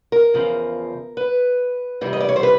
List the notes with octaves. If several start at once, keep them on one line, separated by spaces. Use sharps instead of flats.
A#4
E2 C#3 F3
B4
F2 C3 E3 G3
D#5
D5
C#5
C5
B4